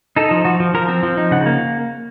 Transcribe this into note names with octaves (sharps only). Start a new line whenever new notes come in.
D#4 A4
F3
F3 F#4
F3
F3 A#4
C4
F3
D#4
C#3 F#5
A#3